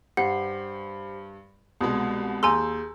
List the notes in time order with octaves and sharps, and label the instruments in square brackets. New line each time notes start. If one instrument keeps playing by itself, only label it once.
[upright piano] G2 [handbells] G4 C5 C7 [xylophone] F#5
[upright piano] C2 B2 G#3 [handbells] A5 D#6
[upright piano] D#2 E6 [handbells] G#4 G6 [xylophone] G#5 A#5 C6